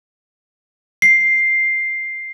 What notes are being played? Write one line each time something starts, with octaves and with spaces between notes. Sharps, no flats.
C7